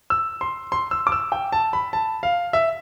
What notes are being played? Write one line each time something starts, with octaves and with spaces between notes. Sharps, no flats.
E6
C6
C6
E6
D6
E6
G5
A5
B5
A5
F5
E5